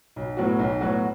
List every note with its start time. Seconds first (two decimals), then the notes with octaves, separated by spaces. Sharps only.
0.16 B1
0.37 A2 F#3 B3 F#4
0.59 B1
0.81 A2 F#3 B3 F#4